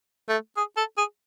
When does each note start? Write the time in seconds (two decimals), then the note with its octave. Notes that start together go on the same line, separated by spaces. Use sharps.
0.29 A3
0.57 G#4
0.77 A4
0.97 G#4